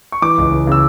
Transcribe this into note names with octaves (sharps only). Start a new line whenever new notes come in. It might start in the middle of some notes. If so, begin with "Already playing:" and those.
C#6
E3 D6
C#2
C#3
C#3 E6